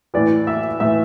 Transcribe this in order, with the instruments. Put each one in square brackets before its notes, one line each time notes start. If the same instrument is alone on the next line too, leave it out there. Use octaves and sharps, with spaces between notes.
[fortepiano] A2 E3 D5
E5
A2 E3 E5